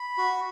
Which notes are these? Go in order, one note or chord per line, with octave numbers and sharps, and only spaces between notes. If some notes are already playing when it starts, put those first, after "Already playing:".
Already playing: B5
F#4